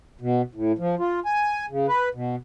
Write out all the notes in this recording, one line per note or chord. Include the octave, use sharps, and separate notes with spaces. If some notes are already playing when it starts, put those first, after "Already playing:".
B2
A2
F3
F4
G#5
C#3
B4
B2